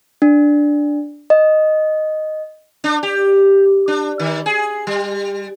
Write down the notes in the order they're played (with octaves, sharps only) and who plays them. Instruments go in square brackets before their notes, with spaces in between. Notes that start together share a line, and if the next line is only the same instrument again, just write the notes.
[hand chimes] D4
D#5
[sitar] D4
G4
D4
D#3
G#4
G3